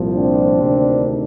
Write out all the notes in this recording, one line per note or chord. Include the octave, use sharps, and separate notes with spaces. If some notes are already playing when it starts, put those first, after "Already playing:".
Already playing: C2 A#2 F3
C4 D4
D2 C3 D#3